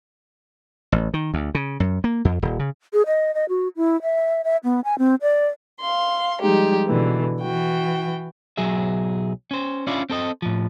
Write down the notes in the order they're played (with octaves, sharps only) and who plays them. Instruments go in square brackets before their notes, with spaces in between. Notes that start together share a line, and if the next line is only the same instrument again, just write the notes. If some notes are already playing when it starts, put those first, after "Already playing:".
[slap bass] A1
D#3
D2
C#3
F#2
A#3
F2
D#1
C#3
[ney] G#4
D#5
D#5
F#4
E4
E5
E5
B3
G#5
C4
D5
[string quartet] F5 C6
F3 G3 G#3 D#4 G4
B2 D3 E3
E3 F#4 G5
[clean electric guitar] B1 F#3 G#4 E5
C#4 C5
C#4 D4 E4 F4 D5
C4 A4 D#5
A2 F3